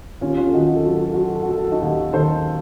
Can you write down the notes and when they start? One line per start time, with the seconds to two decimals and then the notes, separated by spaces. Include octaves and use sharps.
0.21 D#2 C#4 F4
0.37 C#4 F4
0.47 A4
0.53 D#3 D#4 F#4
0.69 F#4
0.76 A4
0.85 F#3 F#4
0.91 A4
0.99 F#4
1.06 A4
1.14 F#4
1.17 F#3 A4
1.28 F#4
1.35 A4
1.43 F#4
1.49 F#3 A4
1.58 F#4
1.65 A4
1.72 D#4 F#4
1.81 D#2
2.13 D#3 A4 C5